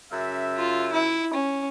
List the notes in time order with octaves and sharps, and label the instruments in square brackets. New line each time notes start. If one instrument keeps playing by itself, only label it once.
[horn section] F#2 C#3 E5
[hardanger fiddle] F4
E4
C#4